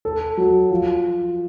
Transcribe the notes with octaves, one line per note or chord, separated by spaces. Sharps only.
A4
F#3
F3